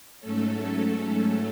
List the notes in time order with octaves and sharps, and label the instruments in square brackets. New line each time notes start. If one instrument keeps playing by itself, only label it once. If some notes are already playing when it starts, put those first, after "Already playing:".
[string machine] G#2 F#3 A3 C#4 A4